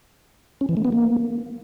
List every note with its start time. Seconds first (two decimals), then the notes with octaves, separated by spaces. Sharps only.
0.61 C#4
0.69 E3
0.77 A3
0.85 B3
0.92 A#3